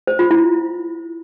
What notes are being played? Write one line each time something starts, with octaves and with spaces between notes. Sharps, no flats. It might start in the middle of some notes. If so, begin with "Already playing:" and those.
C5
F4
E4